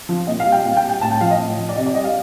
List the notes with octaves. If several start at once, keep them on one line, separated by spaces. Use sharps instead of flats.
F3
A#2 D#5
F5
G3
G5
A#2 F5
G5
G3
G5
A2 A5
G5
F3 F5
D#5
A2
F3
D5
C3 D#5
D5
G3 D#5
F5